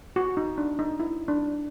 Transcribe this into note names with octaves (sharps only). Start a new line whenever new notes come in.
F#4
D#4
D4
D#4
E4
D4